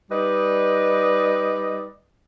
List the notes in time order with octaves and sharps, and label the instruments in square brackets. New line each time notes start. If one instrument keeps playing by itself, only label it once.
[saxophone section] G3 D#4 B4 D5 D#5